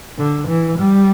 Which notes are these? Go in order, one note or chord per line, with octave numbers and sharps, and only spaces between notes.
D3
E3
G3